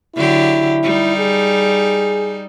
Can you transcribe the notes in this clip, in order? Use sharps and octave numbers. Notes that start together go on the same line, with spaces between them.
D3 F#3 E4 G4
G3 D#4
G#4